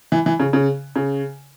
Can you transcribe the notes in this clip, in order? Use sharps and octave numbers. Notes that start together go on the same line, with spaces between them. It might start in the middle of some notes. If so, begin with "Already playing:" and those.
E3
E3
C#3
C#3
C#3